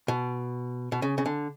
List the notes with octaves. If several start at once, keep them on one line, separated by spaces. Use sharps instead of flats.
B2
B2
C#3
C#3
D3